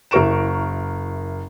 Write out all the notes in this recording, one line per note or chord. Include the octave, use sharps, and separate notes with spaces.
F#1 E4 A#4 C#6 D7 E7